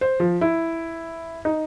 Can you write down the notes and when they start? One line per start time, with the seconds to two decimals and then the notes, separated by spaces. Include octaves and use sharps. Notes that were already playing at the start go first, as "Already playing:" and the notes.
0.01 C5
0.20 F3
0.41 E4
1.45 D#4